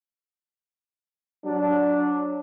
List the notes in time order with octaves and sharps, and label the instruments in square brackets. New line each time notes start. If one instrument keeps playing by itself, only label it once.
[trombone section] F#3 D4